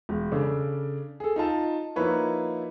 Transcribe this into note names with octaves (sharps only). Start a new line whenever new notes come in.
E1
C#3 D4 A4
G#4 A4
D#4 F4 A5
F3 A#3 D#4 E4 B4 C#5